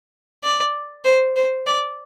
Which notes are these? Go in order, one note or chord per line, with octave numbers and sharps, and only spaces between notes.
D5
C5
C5
D5